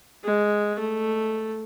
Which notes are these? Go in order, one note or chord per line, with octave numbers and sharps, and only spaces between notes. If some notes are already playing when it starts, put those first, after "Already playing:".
G#3
A3